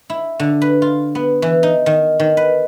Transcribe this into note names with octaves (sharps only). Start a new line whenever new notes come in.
E4
D3
B4
F4
B3
E3
D#4
D#3
D#3
B4